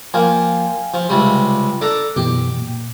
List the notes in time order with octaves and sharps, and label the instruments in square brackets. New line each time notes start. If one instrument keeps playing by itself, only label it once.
[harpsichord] F3 A#3 [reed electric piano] F5 G5 G#5
[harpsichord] F3
C#2 C3 G3
D4 A4 A#5
[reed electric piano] F#2 B2 E3 [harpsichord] G4
[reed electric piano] A#2